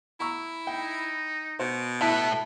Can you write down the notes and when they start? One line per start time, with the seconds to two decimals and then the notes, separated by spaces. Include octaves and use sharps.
0.20 E4 A#5 C#6 E6
0.67 D#4 G5
1.60 B2 C5
2.02 A2 E4 A4 B4